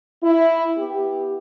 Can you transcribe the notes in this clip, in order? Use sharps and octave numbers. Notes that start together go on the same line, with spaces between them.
E4
B3 E4 G4